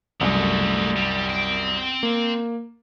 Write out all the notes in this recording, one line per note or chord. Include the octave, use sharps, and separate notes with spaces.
C2 F#2 G#3 A3
G3
C4 G5
A#3